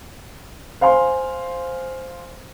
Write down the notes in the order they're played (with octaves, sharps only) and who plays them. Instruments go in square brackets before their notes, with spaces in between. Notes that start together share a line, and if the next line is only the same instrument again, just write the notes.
[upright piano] C5 F5 G#5 C6